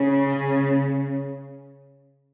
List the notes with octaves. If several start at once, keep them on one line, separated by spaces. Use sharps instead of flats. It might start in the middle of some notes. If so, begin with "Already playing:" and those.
Already playing: C#3